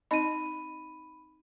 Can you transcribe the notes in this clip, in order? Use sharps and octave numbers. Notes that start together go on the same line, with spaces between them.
C4 D#4 D#5 B5 D#7